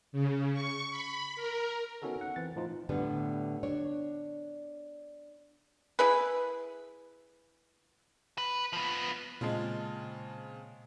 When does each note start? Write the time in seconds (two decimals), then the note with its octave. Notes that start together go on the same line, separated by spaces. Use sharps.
0.12 C#3
0.53 C#6
0.91 B5
1.36 A#4
2.02 B3 C#4 D#4 F#4 A4 A#4
2.21 F#5
2.36 E3 C4 A6
2.56 A2 F3 D#4 F4
2.89 A2 D3 G3 B3
3.63 D4 C#5
5.99 E4 G#4 B4
8.38 B4
8.73 F3 B3
9.41 A#2 C#3 G#3 C4 F4 A5